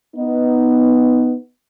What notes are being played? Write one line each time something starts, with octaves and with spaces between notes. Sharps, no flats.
B3 D#4